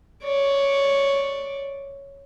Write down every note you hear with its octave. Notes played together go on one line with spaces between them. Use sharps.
C#5 D5